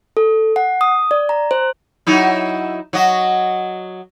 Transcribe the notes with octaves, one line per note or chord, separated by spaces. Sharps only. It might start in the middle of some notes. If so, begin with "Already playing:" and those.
A4
F#5
D#6
D5
A#5
C5
F#3 D#4 E4
F#3 F#4 D#5